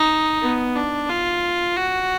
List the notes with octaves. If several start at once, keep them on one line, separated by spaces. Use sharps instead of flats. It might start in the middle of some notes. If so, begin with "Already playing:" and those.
Already playing: D#4
B3
D4
F4
F#4